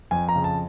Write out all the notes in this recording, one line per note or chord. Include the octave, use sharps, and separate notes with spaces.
F2 G#5
A#5
C#3
A5